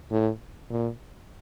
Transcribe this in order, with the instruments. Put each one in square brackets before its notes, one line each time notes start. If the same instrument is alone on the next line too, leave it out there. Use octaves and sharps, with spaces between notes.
[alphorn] A2
A#2